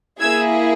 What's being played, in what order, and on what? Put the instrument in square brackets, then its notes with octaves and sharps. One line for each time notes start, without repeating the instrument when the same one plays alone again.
[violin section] A#3 E4 G#4 E6 G#6